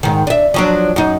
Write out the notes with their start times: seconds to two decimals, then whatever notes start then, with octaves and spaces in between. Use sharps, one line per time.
0.03 G#2 D#3
0.27 D4 E5
0.54 F3 F#3 D4
0.96 F#2 D#4